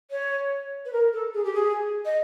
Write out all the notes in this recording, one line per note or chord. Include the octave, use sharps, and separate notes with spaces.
C#5
B4
A#4
A4
G#4
G4
G#4
D#5